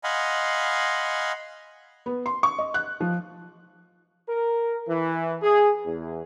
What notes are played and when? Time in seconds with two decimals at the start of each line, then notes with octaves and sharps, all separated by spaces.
0.04 D#5 F5 F#5 G#5 B5 C6
2.06 B3
2.26 C6
2.43 C#6
2.59 D#5
2.74 F#6
3.01 F3
4.28 A#4
4.88 E3
5.42 G#4
5.86 E2